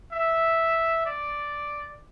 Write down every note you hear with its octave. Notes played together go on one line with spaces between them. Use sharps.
E5
D5